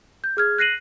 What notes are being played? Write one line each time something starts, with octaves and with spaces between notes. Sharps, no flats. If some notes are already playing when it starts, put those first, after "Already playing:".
G6
G#4 F6 G#6
F#6 A#6 C7 D#7 F#7